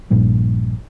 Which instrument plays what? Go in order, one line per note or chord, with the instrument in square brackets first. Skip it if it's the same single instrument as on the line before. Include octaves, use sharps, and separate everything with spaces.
[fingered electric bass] A#1 G2 A#2